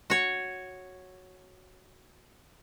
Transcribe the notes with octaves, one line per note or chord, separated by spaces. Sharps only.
F#4 C#5